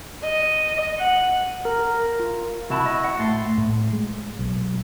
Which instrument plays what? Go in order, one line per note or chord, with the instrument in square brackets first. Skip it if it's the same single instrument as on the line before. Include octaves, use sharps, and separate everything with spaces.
[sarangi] D#5
F#5
[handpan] A#4
A#4
F4
[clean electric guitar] C2 A5 B5 [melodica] E4 F#4
[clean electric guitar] D#5
F#5
[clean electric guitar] A2 [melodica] A5 C6
[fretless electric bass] A2
G#3
B1